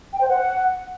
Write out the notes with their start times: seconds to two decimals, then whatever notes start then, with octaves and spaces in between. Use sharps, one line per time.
0.13 G5
0.21 C5
0.29 F#5